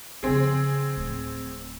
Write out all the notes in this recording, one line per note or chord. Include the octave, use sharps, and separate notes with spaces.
C#3 F3 C4 G#4
D1